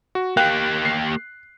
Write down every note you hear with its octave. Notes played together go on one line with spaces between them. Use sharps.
F#4
A#3 G4 F5 G5 F#6
C7